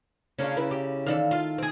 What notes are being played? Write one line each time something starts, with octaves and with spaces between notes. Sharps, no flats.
C#3 C#4 D4 F4 A#4
E4 B4
G4
D#3 E3 A4 D5 F5
F4
C4 G#4